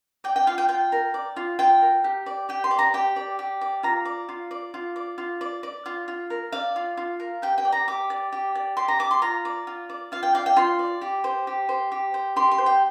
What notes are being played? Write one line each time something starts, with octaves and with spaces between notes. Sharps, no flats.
D5 G5
G5
F4 F5
G5
F4 G5
A#4
D5
F4
F4 G5
A#4
G4
D5
G4 G5
C6
D5
A#5
G4 G5
D5
G4
D5
F4 A#5
D5
F4
D5
F4
D5
F4
D5
D5
F4
F4
A#4
D5 F5
F4
F4
A#4
G4 G5
G5
D5
A#5
G4 D6
D5
G4
D5
G4 C6
A#5
D5 D6
C6
F4 A#5
D5
F4
D5
F4 F5
G5
D5 F5
G5
F4 C6
D5
G4
C5
G4
C5
G4
C5
G4 C6
C6
C5
G5